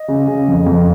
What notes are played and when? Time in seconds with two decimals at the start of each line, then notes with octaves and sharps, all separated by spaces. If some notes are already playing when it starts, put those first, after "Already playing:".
Already playing: D#5
0.08 C#3
0.27 C#3
0.48 F2
0.66 F2